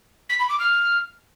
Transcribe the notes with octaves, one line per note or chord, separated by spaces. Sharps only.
B6
B5
D6
F6